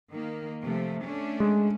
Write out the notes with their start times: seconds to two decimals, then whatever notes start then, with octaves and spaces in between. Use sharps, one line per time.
0.10 D#3 A#3
0.62 C3 F3 A3
1.04 A3 C#4 D4
1.40 G#3